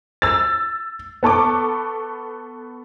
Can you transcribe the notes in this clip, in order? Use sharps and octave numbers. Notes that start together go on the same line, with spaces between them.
E6 A6
B3 A4 C#6 D6